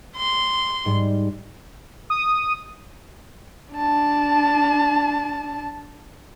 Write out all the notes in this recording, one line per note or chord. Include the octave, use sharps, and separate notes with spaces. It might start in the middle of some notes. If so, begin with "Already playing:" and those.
C6
G#2 G3
D#6
D4 A5